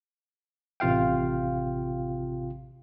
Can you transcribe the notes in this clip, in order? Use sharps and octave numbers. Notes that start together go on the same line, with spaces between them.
A1 C3 F4 F5 G5